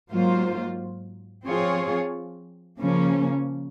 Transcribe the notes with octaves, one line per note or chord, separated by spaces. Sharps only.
G#2 F#3 A#3 F4 C5
F3 C4 F4 G#4 C#5
C#3 F3 A#3 C#4